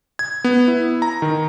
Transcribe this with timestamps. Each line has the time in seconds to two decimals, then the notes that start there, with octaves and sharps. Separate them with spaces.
0.19 G#6
0.44 B3
0.68 E4
1.02 A#5
1.22 D#3